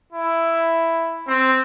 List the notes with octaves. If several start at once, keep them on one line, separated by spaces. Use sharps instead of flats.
E4
C4